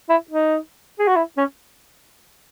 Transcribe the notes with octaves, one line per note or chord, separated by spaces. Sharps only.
E4
D#4
G#4
F#4
E4
C#4